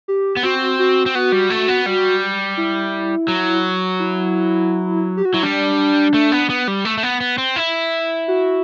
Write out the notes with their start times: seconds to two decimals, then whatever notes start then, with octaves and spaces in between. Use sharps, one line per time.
0.08 G4
0.37 B3
0.43 C4 F#4
0.79 F#4
1.06 C4
1.15 B3 F#4
1.32 G3
1.50 A3
1.68 B3
1.86 G3
2.57 E4
3.28 F#3
4.00 E4
5.17 G4
5.25 F#4
5.34 F#3 E4
5.42 G3 D4
6.14 A3
6.32 B3
6.50 B3
6.68 G3
6.85 A3
6.98 A3
7.03 B3
7.20 B3
7.38 C4
7.56 E4
8.28 F#4